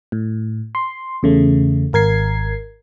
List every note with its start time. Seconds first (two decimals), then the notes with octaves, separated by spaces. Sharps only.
0.12 A2
0.75 C6
1.23 E2 C#3 A3
1.93 G#1 A#4 G#6 C7